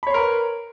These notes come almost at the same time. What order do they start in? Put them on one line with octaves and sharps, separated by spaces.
B5 C#5 C6 A#4 B4